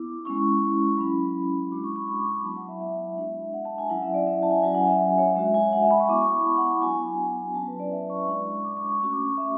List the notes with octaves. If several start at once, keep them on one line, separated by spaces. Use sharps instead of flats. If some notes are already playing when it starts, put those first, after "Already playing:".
Already playing: B3 E4 D6
G#3 C#4 E4 C#6
F#3 C#4 E4 B5
G#3 D4 F#4 D6
C#6
B5
C#6
D6
B5
F#3 B3 E4 A5
F#5
E5
E5
G#3 D4 F#4
F#5
A5
G#5
F#3 C#4 E4 F#5
E5
D5
E5
A5
G#5
F#3 C#4 F#4 G#5
F#5
E5
C#5
G#3 D4 F#4 E5
G#5
F#5
E5
B5
C#6
B3 E4 D6
C#6
B5
A5
F#5
F#5
F#3 B3 D4 F#4 G#5
F#3 C#4 E4 A5
B4
D5
E5
C#6
G#3 D4 F#4
D6
C#6
C#6
A3 C#4 F#4 C#6
D6
C#6
E5